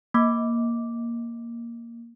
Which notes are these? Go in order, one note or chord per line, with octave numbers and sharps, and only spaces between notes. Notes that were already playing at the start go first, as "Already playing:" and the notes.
A#3 D6